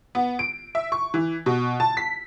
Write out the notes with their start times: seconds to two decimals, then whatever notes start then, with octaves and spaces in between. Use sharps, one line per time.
0.15 B3
0.39 D7
0.75 E5
0.92 C#6
1.14 E3
1.46 B2
1.80 A5
1.97 B6